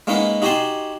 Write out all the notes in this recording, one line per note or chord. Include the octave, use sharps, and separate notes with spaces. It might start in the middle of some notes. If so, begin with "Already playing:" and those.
G#3 A#3 C#4 D#4 B4 F#5
D#4 F#4 G4 G#5 A5 C6